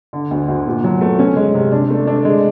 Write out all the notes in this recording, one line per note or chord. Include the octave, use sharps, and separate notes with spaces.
D3
D2
D2
A#2
F#3
A3
C#4
G#3
C3
D4
A3
D4
G#3